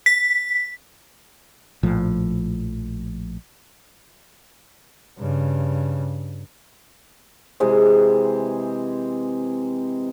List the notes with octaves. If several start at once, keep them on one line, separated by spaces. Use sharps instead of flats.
B6
A#1 A2 F3
G2 C#3
C3 E3 G#3 C4